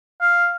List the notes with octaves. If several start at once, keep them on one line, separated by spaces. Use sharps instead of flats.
F5